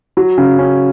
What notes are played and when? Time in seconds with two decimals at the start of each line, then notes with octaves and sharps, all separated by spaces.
0.17 F#3
0.38 C#3
0.59 C#4